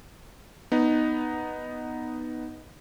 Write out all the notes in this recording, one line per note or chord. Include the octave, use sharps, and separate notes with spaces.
B3 D#4